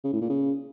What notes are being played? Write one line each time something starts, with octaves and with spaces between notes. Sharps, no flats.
C#3
A2
A#2
C#3